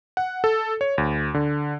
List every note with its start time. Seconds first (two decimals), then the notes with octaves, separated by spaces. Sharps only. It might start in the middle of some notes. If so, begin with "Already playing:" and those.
0.17 F#5
0.44 A4
0.81 C#5
0.98 D2
1.34 D3